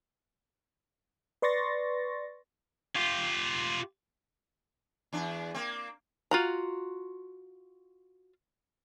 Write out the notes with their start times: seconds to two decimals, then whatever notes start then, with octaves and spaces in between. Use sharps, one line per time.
1.42 B4 D5 C6 C#6 A6 A#6
2.96 F4 G4
5.13 E2 D4
5.54 A#3 C4
6.31 F4 F#4 A#5